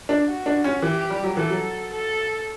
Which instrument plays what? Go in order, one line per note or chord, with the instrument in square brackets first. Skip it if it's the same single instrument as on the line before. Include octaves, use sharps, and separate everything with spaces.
[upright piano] D4
[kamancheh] F#4
[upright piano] D4
C#4
[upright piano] E3 [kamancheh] G4
[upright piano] G3
F#3
[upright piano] E3 [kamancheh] A4
[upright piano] F#3
[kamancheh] A4